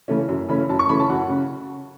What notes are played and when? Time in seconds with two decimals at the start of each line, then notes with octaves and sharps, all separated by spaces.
0.08 C#3 E3 A3 C#4
0.29 F#2
0.49 C#3 E3 A3 C#4 B5
0.69 F#2 A5
0.79 C#6
0.89 C#3 E3 A3 C#4 B5
1.00 A5
1.09 F#2 F#5
1.29 C#3